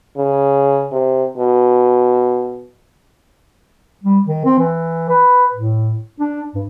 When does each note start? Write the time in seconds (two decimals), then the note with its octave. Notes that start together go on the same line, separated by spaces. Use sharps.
0.17 C#3
0.92 C3
1.38 B2
4.04 G3
4.27 D#3
4.45 C4
4.59 E3
5.09 B4
5.54 A2
6.20 D4
6.55 G2